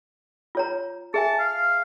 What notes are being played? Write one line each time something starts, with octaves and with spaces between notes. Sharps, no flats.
F4 C#5 A#5
G#4 E5 G#5 A5
F5